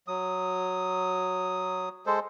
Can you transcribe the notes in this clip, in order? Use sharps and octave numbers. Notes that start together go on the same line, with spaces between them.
F#3 D#6
G#3 A4 C5